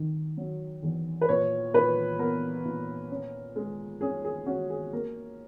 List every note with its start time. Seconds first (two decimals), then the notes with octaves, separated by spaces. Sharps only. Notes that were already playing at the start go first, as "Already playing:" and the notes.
Already playing: D#3
0.37 F#3
0.82 E2
1.21 B4
1.29 A#2 C#5
1.74 A#2 B4
2.19 B3 A#4
2.64 A#2
3.11 C#4
3.56 G#3
4.01 C#4 G#4
4.24 G#4
4.46 C#4 F#4
4.70 G#4
4.93 A#3 A#4